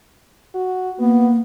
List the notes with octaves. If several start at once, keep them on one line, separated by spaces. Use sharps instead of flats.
F#4
A#3 B3